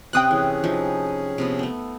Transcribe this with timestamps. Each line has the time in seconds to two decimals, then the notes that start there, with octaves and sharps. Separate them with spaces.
0.13 C3 C4 C#4 G5 D#6 F#6
0.31 E3 C#4 G#4
0.64 F3 D#4 E5
1.38 C3 F3 B3
1.59 A3 B3